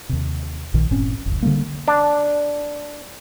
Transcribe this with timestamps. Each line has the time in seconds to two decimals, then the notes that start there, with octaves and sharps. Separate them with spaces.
0.09 D#2 C3
0.74 A#1 A#2 D#3
0.91 F#1 A2 C4 C#4
1.26 F1 C#2
1.43 D3 F#3 G3 A#3
1.88 D4